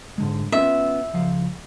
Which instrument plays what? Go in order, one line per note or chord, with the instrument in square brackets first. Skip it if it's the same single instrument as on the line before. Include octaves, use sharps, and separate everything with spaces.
[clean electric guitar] G#2 D3 G#3
[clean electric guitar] B3 C#4 F4 [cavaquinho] E5
[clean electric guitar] C#2 F3 F5